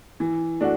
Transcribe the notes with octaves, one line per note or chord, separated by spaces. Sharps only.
E3
A3 D4 F#4